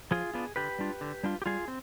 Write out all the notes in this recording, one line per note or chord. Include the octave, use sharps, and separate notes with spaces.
F3 F4 G#4
B3 D4 F4
D3 G4 B4
G3 D4 F4
D3
G3 D4 F4
G4
G3 F4 G#4
C4